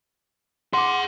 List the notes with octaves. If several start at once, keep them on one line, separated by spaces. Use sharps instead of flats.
G#4 F#5 C6 D6